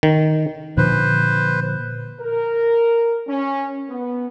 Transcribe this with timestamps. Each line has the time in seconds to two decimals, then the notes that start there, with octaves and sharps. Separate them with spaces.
0.03 D#3
0.77 A#2 D3 F3 B4 C5
2.21 A#4
3.28 C#4
3.89 B3